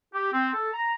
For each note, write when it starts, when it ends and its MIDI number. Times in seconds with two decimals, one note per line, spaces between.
0.14 0.32 67
0.33 0.53 60
0.54 0.68 69
0.74 0.93 82